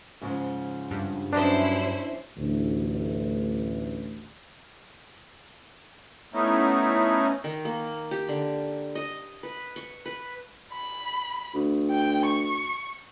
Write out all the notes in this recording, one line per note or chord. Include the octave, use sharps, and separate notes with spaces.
G#2 C#3 F3
G2
F#2 C#4 D4 E4 B4 C5 D#5
A1 D2
A3 B3 C#4 D#4 E4
D#3
A#3
G4
D3
D#5
B4
C#6
B4
B5
D2
G5
C#6